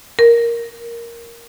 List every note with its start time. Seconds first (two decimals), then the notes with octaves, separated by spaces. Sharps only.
0.19 A#4